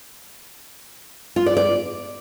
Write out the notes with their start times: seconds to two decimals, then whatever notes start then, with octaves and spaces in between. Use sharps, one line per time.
1.36 F4
1.46 D5
1.57 D5